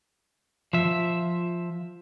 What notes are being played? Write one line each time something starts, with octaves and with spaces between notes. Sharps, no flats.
F3 E5